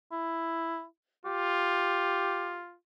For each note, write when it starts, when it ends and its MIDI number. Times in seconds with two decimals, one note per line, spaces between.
0.12 0.84 64
1.25 2.77 65
1.25 2.60 67